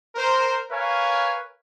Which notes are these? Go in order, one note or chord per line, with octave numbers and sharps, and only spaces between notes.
A#4 C5
A#4 B4 C#5 F5 G#5